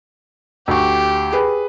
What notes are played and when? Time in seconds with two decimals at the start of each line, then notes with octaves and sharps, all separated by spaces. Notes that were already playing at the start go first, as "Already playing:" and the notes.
0.68 D2 G4 C#6
1.32 G#4 B4